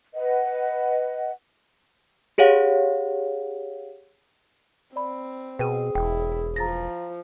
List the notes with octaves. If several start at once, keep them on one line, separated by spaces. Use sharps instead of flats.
B4 D#5 F#5
G4 G#4 C#5 F5 F#5
C4 D5 B5
B2 G#4 B4 G5 D#7
E1 E4 G5
F3 A#5 A6 A#6